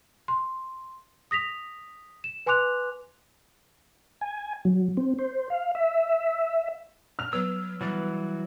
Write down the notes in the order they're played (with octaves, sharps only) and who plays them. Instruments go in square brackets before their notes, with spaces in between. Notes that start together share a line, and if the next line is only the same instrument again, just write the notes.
[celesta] C6
D#6 A#6 B6 F7
E7
B4 G#5 C6 D6 F#6 F7
[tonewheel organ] G#5
F#3
C4
C5
F5
E5
[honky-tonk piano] F6 F7
[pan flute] F#3 [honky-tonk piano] B3 [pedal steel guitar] E6
[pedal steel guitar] E3 F#3 [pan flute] G3